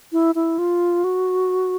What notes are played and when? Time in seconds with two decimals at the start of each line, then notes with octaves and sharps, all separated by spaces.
0.13 E4
0.35 E4
0.59 F4
1.04 F#4